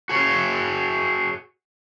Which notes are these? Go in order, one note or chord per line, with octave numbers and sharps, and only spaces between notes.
F#4 G#4 C#5